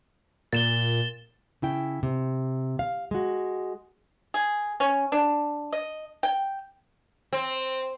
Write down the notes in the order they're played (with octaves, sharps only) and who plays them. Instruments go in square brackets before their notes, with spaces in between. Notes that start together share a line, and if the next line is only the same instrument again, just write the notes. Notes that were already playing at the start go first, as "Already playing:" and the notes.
[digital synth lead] A#2 [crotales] A6 E7 G7
[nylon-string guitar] C#3 E4 G5
C3
F5
G#3 F#4
[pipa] G#4
C#4
D4
D#5
G5
[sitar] C4